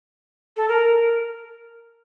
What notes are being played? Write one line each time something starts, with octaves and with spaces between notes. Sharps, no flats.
A4
A#4